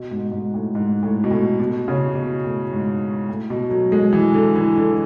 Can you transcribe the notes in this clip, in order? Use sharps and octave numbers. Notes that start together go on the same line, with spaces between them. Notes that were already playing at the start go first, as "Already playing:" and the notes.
Already playing: B2
G#2
G#2
A2
G#2
A2
B2
A2
B2
C#3
B2
A2
G#2
A2
B2
F#3
G#3
E3
D3
E3
D3